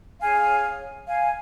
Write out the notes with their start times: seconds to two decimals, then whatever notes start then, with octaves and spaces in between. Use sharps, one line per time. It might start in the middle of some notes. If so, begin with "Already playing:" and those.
0.21 C#4 G#4 C#5 F5 G#5
1.07 F5 G#5